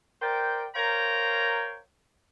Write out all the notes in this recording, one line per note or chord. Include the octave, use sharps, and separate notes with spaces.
A#4 C5 D5 G5
A#4 C5 C#5 F5 G5 A#5